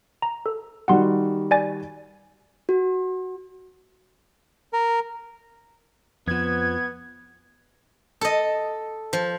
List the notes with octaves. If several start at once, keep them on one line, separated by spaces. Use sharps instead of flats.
A#5
A4
D#3 G3 F#4 F#5 C6
D5 G#5 A6
F#4
A#4
F2 F3 B3 G#6
A4 D#5
F3